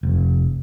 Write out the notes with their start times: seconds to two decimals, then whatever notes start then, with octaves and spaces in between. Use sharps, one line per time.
0.03 F1